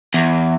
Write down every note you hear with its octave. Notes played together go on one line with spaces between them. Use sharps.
E2